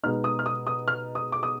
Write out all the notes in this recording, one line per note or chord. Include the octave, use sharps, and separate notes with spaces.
B2 G#3 B3 D#4 F6
D#6
F6
D#6
D#6
F6
D#6
D6
D#6